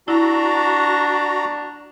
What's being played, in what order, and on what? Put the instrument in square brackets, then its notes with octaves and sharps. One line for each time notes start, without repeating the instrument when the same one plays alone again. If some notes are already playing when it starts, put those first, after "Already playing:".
[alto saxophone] D4 [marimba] E4 [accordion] F#4 A#5